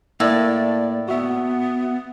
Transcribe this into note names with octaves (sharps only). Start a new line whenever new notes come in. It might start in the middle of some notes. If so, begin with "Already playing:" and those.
A2 A#3 D5
B3 F#4 E5